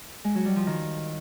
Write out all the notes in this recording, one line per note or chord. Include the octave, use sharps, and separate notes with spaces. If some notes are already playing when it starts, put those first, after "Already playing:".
G#3
F#3
G3
F3
D#3